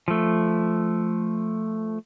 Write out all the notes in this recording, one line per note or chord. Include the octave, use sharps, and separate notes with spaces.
F3 A3